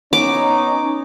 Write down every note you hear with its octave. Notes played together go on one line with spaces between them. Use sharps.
B3 C#4 D#4 D6